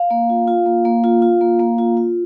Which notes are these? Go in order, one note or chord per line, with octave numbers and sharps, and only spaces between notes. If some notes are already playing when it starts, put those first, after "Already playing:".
Already playing: F5
A#3
F4
F4
A#3
A#3
F4
F4
A#3
A#3
F4
F4